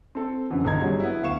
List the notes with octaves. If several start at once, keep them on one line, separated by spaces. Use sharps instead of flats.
C4 A4
F#2 D3 E3
G1 D#4 A#5 G#6
F#3 G3 C#4 G#4
B3 E4
D2 F5 C#6 E7